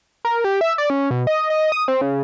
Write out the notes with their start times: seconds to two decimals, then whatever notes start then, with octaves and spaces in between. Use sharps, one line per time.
0.25 A#4
0.44 G4
0.61 E5
0.78 D5
0.90 C#4
1.11 B2
1.27 D#5
1.50 D#5
1.72 D#6
1.88 C4
2.01 C#3